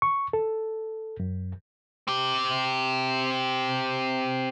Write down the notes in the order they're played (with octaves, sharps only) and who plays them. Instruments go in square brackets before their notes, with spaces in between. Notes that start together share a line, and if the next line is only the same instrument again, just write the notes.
[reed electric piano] C#6
A4
F#2
[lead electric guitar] C4 G4